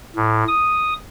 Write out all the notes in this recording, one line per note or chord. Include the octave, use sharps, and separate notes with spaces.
A2
D#6